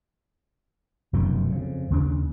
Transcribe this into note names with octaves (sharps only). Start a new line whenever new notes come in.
F1 F#2 B2 D#3
F2 C#3
D#2 C#3 D4